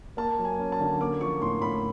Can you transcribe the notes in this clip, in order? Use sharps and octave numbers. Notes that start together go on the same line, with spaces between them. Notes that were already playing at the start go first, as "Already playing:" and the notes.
A#3 A5
F#3
G#5
C#4
A5
D3
A#3 D6
F3 C#6
A2 C6
A2 B5